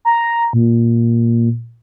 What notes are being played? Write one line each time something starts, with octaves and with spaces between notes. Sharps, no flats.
A#5
A#2